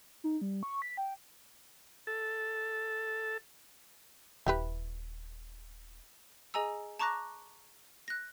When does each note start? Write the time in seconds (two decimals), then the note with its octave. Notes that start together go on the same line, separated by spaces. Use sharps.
0.24 D#4
0.41 G3
0.63 C#6
0.82 B6
0.97 G5
2.07 A4
4.46 D#1 E4 G4 B4
6.54 G#4 D#5 G#5 A#5 E6
6.99 A5 A#5 C#6 D6 F#6 A#6
8.08 F#6 A#6